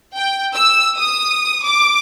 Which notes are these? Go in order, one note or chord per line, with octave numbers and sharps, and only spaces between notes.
G5
E6
D#6
D6